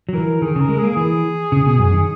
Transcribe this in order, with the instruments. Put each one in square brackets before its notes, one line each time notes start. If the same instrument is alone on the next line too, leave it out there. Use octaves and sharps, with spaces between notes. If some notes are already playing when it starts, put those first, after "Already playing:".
[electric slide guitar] F#3
[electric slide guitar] E3 [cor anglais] A#4
[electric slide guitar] D#3 [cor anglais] G#4
[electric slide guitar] C#3 [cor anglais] A#4
[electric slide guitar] G#3
[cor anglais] G#4
[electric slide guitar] A#3
[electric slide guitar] E3 [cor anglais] G#4
[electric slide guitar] C#3
B2
F#2
D#3